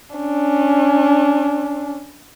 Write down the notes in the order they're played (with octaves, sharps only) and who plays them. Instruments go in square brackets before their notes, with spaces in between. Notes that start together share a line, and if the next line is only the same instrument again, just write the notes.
[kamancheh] C#4 D4